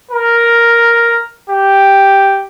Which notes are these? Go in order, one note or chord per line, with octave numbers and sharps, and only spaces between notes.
A#4
G4